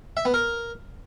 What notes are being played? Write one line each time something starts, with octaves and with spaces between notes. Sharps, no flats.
E5
B3
A#4